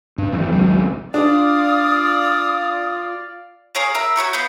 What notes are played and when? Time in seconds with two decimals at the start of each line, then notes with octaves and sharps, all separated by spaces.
0.18 G2
0.32 G#1 E2 F3 C4
0.52 G#1 C#2 F#3 C4
1.14 D4 F4 D5 F5 D#6
3.75 G#4 A#4 C#5 F5
3.94 A#4 E5 A#5 B5
4.16 F#4 G#4 C#5 G5
4.33 B3 F4 B5 G6